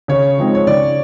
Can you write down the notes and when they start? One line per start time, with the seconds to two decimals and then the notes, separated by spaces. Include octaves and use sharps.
0.08 C#3 C#5
0.38 F3 G#3 C4 D#4
0.55 C#5
0.66 C#3 D5